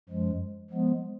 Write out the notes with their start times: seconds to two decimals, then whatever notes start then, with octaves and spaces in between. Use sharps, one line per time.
0.09 F#2 F3 G#3
0.71 F3 G#3 B3